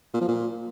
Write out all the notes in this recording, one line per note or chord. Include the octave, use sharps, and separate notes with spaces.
A#2
F3
A#2